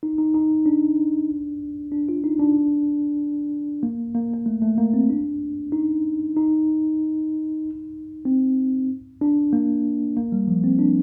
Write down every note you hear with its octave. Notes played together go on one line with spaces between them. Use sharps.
D#4
D#4
D#4
D4
D4
F4
D#4
D4
A#3
A#3
A#3
A3
A3
A#3
C4
D4
D#4
D#4
C4
D4
A#3
A#3
G3
F3
C4
D4